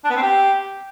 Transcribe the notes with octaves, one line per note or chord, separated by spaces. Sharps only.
D4
B3
C4
G4